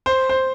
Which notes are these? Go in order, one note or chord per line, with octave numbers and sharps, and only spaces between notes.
C5
C5